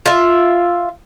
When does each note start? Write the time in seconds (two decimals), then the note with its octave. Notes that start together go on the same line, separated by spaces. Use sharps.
0.06 F4 E5